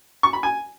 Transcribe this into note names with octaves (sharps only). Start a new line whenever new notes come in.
C#6
B5
G#5